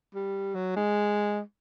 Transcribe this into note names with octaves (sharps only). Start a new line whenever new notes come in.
G3
F#3
G#3